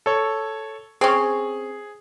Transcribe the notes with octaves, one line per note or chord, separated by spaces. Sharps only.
A4 C#5
C4 C#4 G#4